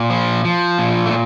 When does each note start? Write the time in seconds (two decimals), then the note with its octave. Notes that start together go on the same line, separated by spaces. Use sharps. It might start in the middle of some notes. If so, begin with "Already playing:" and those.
Already playing: A#2
0.10 F3
0.45 F3
0.78 A#2
1.06 A3